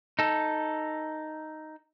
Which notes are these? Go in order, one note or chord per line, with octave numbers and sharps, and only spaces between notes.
D#4 A4